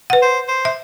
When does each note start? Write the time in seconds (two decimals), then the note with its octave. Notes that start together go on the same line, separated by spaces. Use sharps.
0.10 B4 F#5
0.22 C5
0.48 C5
0.65 E5